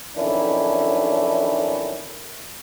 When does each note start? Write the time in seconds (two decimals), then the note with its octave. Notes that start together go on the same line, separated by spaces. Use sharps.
0.17 B1 F2 D#3 C#4 D4 E4